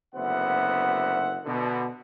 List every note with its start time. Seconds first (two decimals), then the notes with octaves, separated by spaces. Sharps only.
0.15 F#1 D2 B3 C5 E5 F#5
1.46 B2 D3